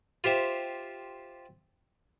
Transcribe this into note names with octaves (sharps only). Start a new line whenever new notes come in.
F4 G4 C5 E5